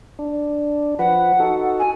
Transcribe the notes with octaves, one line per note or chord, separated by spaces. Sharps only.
D4
F3 B4 F#5
D#4 F#4 A4
G#5